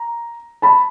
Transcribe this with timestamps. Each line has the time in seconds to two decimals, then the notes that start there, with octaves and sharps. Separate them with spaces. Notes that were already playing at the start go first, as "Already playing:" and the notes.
Already playing: A#5
0.62 A5 B5